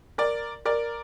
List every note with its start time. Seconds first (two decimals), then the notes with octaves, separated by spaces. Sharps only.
0.18 A#4 D5
0.65 A#4 D5